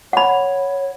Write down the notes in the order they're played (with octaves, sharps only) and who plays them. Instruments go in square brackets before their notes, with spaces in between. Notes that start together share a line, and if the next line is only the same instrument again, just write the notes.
[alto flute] C#5 [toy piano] F#5 B5